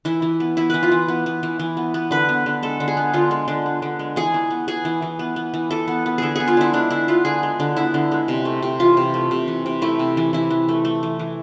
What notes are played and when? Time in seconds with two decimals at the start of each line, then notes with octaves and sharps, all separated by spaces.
0.05 E3 E4
0.22 E3
0.40 B3
0.57 B3 E4
0.70 E3 B4
0.83 F4
0.92 E3
1.08 B3
1.26 B3
1.43 E3
1.59 E3
1.77 B3
1.94 B3
2.11 D3 B4
2.29 B3
2.46 D3
2.63 G#3 A4
2.80 D3
2.88 G#4
2.97 B3
3.13 D3 F4
3.31 G#3
3.48 D3
3.66 B3
3.82 D3
3.99 G#3
4.16 E3 G#4
4.34 E3
4.50 B3
4.68 B3 G#4
4.85 E3
5.02 E3
5.19 B3
5.36 B3
5.54 E3
5.71 E3 A4
5.88 B3
6.06 B3
6.18 D3 G#4 A4
6.36 B3 G#4
6.48 F4
6.57 D3 E4
6.73 G#3 D4
6.90 D3 E4
7.08 B3 F4
7.25 D3 G#4
7.43 G#3
7.60 D3
7.77 B3 E4
7.94 D3
8.12 G#3
8.28 C3
8.45 A3
8.62 C3
8.80 E3 F4
8.97 C3
9.14 A3
9.31 C3
9.48 E3
9.66 C3
9.82 A3 E4
9.99 C3
10.17 E3
10.33 E3 E4
10.50 E3
10.69 A3
10.85 A3
11.03 E3
11.19 E3